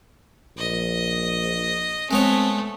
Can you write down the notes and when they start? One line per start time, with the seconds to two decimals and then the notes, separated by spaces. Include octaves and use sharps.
0.57 A#1 D#5
2.11 G#3 A3 B3 C4 C#5